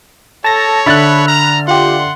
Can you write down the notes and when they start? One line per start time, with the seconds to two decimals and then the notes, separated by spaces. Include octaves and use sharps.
0.44 A4 C#5 A5 A#6
0.86 D3 A4 E5 B5 F#6 A6
1.28 A#5 F6
1.68 F4 G4 F#5 C6